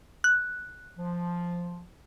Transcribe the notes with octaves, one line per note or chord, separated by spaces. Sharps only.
F#6
F3